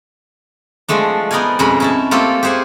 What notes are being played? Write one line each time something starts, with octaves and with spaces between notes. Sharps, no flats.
F3 G#3 A3 D4
B3 D#4 A#4 D5 F5 G#5
F2 B2 G#3 C#4 A#4 B5
C#4 E4 A5
A3 A#3 C4 F4 G4 A4
G4 G#4 C5 F#5 G#5